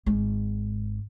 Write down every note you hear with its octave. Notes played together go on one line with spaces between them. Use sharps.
G#1 G#2